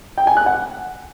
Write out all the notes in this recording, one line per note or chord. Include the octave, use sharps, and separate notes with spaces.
G5
G#5
F#6
F#5